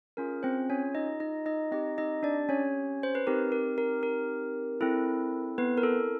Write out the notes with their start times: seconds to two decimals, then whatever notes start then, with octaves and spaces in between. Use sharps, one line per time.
0.17 C#4 F4 G#4 A#4
0.43 C4 C5
0.70 C#4 C#5
0.95 D#4 D#5
1.20 D#4 D#5
1.46 D#4 D#5
1.72 C4 D#4 G4 D#5
1.98 D#4 D#5
2.23 D4 D5
2.49 C#4 C#5
3.03 C5
3.15 B4
3.27 C4 D#4 G4 A#4
3.52 A#4
3.78 A#4
4.03 A#4
4.81 C4 E4 A4
5.58 B3 B4
5.77 A#4
5.83 A4